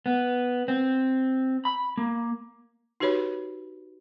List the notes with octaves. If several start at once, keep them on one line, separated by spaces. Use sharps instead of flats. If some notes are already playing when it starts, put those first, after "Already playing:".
B3
C4
B5
A#3
D#4 F#4 G4 B4 C#5 B5